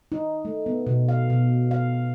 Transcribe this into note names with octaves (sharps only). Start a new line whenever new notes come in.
D#4
A3
B3
B2
F5
B2
F5